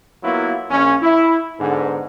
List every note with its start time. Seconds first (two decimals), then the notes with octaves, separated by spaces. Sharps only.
0.23 F#3 A#3 B3 E4 F4 B4
0.71 A#1 C#4
1.02 E4
1.59 G#2 D3 B3